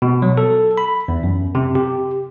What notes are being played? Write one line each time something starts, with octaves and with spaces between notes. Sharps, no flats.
B2
F#3
A4
B5
E2
F#2
C3
G4